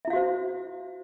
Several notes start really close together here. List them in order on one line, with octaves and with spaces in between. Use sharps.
E5 E4 F5 F#4 C5